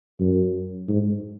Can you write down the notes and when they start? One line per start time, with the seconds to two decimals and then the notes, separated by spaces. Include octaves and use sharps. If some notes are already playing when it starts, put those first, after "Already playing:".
0.20 F#2
0.89 G#2